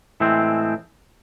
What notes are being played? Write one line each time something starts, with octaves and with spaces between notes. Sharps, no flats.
A2 E3 G#3 C4